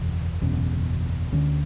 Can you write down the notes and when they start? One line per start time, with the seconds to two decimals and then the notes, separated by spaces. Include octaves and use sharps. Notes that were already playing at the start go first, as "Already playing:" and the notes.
Already playing: F#1 E2 B2
0.41 F#1 E2 B2 C#4
1.32 D2 D3 C#4